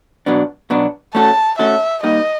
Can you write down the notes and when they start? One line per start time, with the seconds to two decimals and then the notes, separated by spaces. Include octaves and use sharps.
0.26 B2 F#3 B3 D4
0.70 B2 F#3 B3 D4
1.15 A3 C#4 F#4 A4 A5
1.59 A3 C#4 F#4 A4 E5
2.03 G3 A#3 D#4 D#5